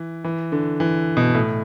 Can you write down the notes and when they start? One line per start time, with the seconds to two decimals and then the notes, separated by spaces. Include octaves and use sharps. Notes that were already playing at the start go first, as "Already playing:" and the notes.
Already playing: E3
0.24 E3
0.52 D3
0.80 E3
1.17 B2
1.34 A2